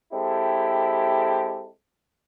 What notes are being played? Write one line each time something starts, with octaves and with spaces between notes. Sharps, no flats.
G#3 C4 E4 G4 A4